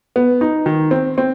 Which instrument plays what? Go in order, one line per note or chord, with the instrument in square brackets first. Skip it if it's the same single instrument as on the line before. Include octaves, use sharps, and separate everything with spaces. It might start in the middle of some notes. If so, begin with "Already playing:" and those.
[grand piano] B3
D#4
D#3
C4
C4